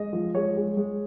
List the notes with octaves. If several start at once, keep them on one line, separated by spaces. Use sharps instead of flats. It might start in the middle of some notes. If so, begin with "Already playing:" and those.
Already playing: G#3 D#5
F3
G#3 C#5
G#3
G#3